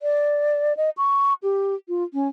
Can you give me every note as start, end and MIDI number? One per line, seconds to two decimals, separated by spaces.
0.02 0.76 74
0.77 0.90 75
0.97 1.34 85
1.43 1.75 67
1.88 2.04 65
2.13 2.28 61